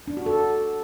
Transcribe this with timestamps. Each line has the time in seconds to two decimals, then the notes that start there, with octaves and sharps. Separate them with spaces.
0.08 D4
0.17 F#4
0.26 A4